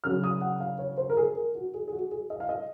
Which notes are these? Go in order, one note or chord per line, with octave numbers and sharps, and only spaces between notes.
C#3 F#3 C#4 F6
D#6
F#5
F5
C#5
C5
A#4
G#4
A#4
F#4
G#4
G#4
F#4
G#4
D#5
F5
D#5